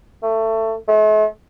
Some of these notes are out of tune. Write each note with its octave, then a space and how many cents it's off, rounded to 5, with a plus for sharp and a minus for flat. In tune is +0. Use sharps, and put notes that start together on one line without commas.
A3 +20
A3 -45